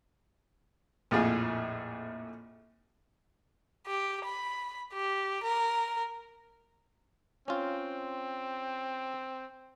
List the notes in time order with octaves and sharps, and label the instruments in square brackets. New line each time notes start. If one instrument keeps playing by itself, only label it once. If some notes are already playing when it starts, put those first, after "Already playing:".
[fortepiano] A#1 F2 A2 F4 G#4
[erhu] G4
B5
G4
A#4
[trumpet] C4 [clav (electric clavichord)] C#4 F4